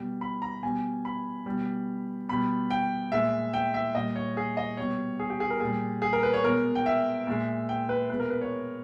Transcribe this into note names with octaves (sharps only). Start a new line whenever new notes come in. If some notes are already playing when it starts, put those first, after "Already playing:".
Already playing: B2 G3
B5
A#5
B2 G3 G#5
B5
B2 G3
B2 G3 B5
G5
A#2 G#3 E5
G5
E5
A#2 G3 D#5
C#5
G#4
D#5
B2 G3 C#5
G#4
G4
G#4
A#4
A#2 G3 G#4
G#4
A#4
B4
C#5
B2 G#3 A#4
G5
E5
A#2 G#3
G5
B4
B2 G#3 B4
A#4
B4
C#5